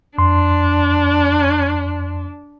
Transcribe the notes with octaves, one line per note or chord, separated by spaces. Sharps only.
F2 D4 C6